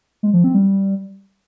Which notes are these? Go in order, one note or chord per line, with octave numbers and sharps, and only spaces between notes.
G#3
F3
C4
G3